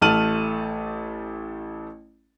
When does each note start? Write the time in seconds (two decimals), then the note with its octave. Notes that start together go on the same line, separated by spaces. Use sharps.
0.02 A1 A3 A5 F6 D#7 F#7